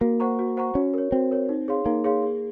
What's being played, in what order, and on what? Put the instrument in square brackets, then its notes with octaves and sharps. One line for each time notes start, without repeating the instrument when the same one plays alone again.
[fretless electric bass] A#3 [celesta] F#4
[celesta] C5 F#5 A#5 C#6
F#4
C5 F#5 A#5 C#6
[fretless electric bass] C#4 [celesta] F#4
[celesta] A#4 C#5
[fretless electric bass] C4 [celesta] F#4
[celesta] A#4 C#5
D#4
G#4 C#5 F5 C6
[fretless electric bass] A#3 [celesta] D#4
[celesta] G#4 C#5 F5 C6
G#4